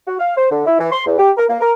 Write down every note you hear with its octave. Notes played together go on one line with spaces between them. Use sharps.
F#4
F5
C5
D3
E4
E3
C6
E2
G4
A#4
A#3
A#4